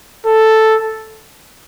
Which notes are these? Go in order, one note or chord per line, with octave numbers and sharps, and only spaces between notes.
A4